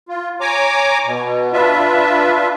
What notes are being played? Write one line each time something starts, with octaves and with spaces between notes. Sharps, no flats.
F4
C#5 G#5 A#5 D6
B2
D4 F4 B4 E5